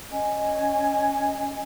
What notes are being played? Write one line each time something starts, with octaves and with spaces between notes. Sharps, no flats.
C#4 D#5 G#5